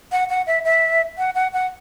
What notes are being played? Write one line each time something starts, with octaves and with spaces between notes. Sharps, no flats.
F#5
F#5
E5
E5
F#5
F#5
F#5